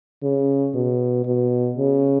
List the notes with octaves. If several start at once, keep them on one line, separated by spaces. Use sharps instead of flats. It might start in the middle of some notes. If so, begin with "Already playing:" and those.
C#3
B2
B2
C#3